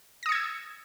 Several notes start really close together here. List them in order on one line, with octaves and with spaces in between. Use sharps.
A#6 D#6 C#7 G#6 E6